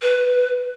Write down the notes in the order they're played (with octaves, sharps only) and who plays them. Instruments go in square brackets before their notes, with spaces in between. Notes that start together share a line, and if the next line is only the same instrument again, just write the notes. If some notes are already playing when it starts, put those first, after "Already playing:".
[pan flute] B4